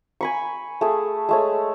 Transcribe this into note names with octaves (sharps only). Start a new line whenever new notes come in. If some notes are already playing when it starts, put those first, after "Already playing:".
G#5 B5 C#6
A3 G#4
G#3 A3 C#5